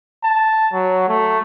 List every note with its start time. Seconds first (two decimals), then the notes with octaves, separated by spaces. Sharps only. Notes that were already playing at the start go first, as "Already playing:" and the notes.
0.24 A5
0.73 F#3
1.08 A3